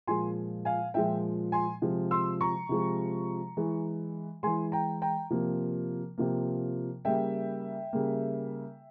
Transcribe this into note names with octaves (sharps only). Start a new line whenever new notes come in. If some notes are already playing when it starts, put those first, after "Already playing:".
A#2 F3 G#3 G#5 C6
F5 G#5
A#2 F3 G#3 E5 G5
G#5 C6
C3 F3 G#3
C6 E6
A#5 C#6
C3 F3 G#3
E3 G#3
E3 G#3 G#5 C6
G5 A#5
G5 A#5
C3 F3 A#3
C3 F3 A#3
C#3 G3 A#3 E5 G5
C#3 G3 A#3